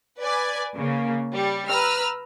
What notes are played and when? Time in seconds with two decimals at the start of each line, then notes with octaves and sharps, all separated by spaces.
0.20 B4 D5 G#5
0.76 C#3 A#3
1.34 G3
1.69 B4 A#5 E6 F6